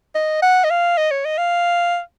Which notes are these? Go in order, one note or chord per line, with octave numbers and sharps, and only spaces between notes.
D#5
F#5
D#5
F5
D#5
C#5
D#5
F5